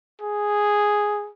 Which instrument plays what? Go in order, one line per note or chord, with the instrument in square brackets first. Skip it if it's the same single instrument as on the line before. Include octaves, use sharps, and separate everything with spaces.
[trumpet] G#4